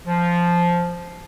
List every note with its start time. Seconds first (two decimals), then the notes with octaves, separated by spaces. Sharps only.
0.07 F3